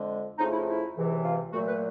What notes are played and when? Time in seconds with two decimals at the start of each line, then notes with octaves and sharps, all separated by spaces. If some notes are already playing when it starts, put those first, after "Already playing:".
Already playing: F2 D3 F3 G#3
0.38 F2 C#3 F3 A3 D#4
0.52 E4
0.67 E4
0.96 C#2 C3 E3
1.24 F4
1.53 A#2 F#3 A3 F#4
1.68 B4